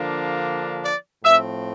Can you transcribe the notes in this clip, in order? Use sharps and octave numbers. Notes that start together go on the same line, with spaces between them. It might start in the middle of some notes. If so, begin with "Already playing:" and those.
Already playing: D3 F3 A#3 D4
D5
A2 F3 C4 E5